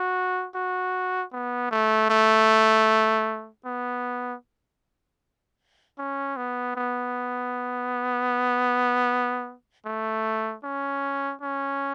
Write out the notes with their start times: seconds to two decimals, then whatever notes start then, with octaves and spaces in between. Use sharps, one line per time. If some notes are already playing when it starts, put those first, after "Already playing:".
Already playing: F#4
0.55 F#4
1.32 B3
1.71 A3
2.10 A3
3.65 B3
5.98 C#4
6.37 B3
6.76 B3
9.86 A3
10.64 C#4
11.41 C#4